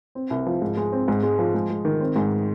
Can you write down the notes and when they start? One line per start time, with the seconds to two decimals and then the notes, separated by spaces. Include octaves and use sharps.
0.15 C4
0.30 C2
0.46 F3
0.62 G#2
0.77 G#3
0.92 C4
1.08 G#2
1.23 G#3
1.39 F3
1.54 G#3
1.70 G#3
1.85 D#3
2.01 C4
2.16 G#2